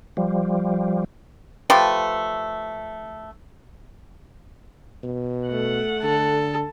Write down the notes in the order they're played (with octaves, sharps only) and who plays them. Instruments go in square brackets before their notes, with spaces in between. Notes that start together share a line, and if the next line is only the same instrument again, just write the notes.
[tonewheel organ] F3 G3
[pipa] F3 A3 G4 B4
[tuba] B2
[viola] A3 F#5
[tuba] D3 [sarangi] A4